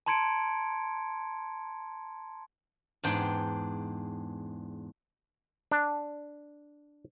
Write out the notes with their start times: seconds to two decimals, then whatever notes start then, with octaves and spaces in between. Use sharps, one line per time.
0.06 A5 A#5 C6 G#6 C#7 D7
3.04 E2 G#2 D4 G5
5.71 D4